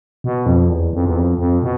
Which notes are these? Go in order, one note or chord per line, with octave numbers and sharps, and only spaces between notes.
B2
F2
E2
F2
E2
F2
F2
B2